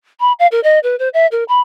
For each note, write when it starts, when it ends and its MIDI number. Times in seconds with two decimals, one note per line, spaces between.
0.20 0.33 83
0.39 0.47 77
0.52 0.60 70
0.64 0.79 75
0.83 0.96 71
0.99 1.09 72
1.14 1.27 76
1.32 1.44 70
1.49 1.61 83